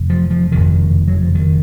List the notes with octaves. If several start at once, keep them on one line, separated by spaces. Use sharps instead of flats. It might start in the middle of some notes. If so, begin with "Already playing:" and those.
Already playing: F1 F2
F3
F3
F#1 F2 C3 D#3
F#3
F3
D#3